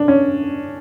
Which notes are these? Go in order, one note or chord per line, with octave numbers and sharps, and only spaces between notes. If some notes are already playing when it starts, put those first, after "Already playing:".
Already playing: D4
C#4